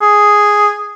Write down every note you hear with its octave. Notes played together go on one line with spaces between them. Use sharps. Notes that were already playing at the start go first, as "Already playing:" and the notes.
G#4